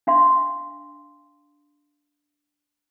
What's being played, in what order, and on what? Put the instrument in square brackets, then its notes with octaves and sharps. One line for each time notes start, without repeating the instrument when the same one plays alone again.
[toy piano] D4 F5 C6